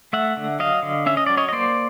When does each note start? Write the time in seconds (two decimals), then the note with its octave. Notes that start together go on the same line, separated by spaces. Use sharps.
0.13 A3 E5 F#5
0.37 D3
0.59 F#3 D#5 F5
0.83 D3
1.06 C#4 E5
1.17 D#5
1.26 F#3 D5
1.37 C#5 D#5
1.49 D#5
1.52 A#3 C5 D5